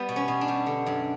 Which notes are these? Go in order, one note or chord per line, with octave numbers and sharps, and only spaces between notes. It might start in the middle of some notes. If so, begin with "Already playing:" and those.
Already playing: G3 B3
B2
C#4
B2
D4
G3
D3
F#2